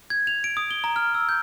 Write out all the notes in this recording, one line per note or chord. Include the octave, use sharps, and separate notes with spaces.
G#6
F7
D7
D#6
G7
A#5
F6
E6
G6